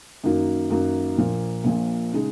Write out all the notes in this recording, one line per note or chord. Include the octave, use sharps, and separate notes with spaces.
F#2 D#3 A#3 D#4 F#4
F#2 D#3 A#3 D#4 F#4
A#1 A#2 F3 A#3
A#1 A#2 F3 A#3
C#3 G#3 D#4